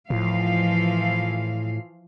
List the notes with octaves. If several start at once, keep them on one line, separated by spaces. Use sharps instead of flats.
D1 A2 E3 F3 F5